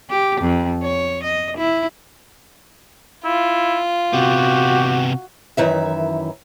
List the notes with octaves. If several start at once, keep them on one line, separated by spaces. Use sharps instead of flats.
G4
F2
C#5
D#5
E4
E4 F4
C3 B3 F#4 G4
F#2 D#3 E3 E5